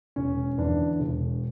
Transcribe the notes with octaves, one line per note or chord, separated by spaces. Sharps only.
E1 C#4
E2 D3 D4
E1